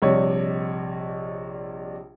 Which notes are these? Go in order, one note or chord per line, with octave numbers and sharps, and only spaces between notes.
A#1 C3 G3 C#5 D#5